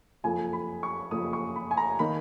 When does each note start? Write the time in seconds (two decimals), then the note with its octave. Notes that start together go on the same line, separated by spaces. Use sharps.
0.24 F#1 F2 F3 G#5
0.53 B5
0.83 C#6
1.11 F#1 F2 F3 D#6
1.33 C#6
1.56 B5
1.71 G#5
1.77 A#5
1.99 D#3 A#3 D#4 B5